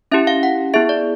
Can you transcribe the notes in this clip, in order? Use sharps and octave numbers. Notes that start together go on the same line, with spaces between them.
C#4 E4 G4 E5
F5
F#5
B3 E4 G#4 E5
D5